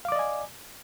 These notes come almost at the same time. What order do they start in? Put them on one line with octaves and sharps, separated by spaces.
F5 D6 D5 D#5 G#5